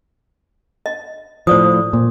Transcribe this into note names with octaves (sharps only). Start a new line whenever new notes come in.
D#5
A2 F3 C5 D5 D#6
A#2